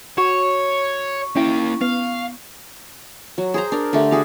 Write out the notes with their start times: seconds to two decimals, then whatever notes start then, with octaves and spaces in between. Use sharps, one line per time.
0.18 F#4 C#5 C#6 E7
1.36 A#3 C#4 E4 G5
1.81 B3 F5
3.38 F#3
3.54 G#4 C5 A#5
3.72 D4 A#4
3.93 D3 A3 G4
4.11 F#4 G#4 F5